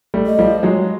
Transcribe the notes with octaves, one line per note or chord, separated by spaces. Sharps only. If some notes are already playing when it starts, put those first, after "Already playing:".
G3 A3
D#5
F3 G3
F#3 G#3